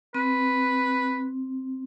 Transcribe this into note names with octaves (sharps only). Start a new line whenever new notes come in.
C4 B4